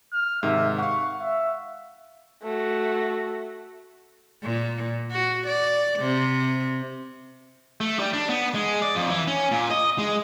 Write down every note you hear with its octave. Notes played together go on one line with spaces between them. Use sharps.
F6
G#2 C3 D#3 E5
F5 F#5 C#6
E5
A3 F#4
A#2
F#4
D5
C3
A3
G3
D4
B3
G#3
D5
F2
E3
C#4
A#2
D#5
G#3